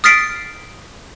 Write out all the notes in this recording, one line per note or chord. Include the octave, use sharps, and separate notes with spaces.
D#6 F6 A6 B6 C7 D7